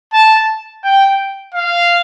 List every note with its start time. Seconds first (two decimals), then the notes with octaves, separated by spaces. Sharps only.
0.13 A5
0.84 G5
1.55 F5